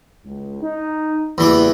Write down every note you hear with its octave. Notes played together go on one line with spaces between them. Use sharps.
C#2
D#4
F#1 E2 E3 G3 D6